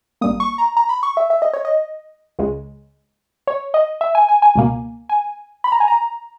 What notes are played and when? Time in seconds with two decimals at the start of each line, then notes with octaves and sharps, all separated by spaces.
0.21 G#1 G2 G3 A#3 D#6
0.40 C#6
0.58 A#5
0.77 A#5
0.89 B5
1.03 C#6
1.17 E5
1.30 E5
1.42 D#5
1.53 C#5
1.65 D#5
2.39 C#2 C#3 G#3
3.47 C#5
3.74 D#5
4.01 E5
4.15 G#5
4.29 G#5
4.42 G#5
4.55 C#2 B2 A#3
5.09 G#5
5.64 B5
5.72 A#5
5.80 G#5
5.88 A#5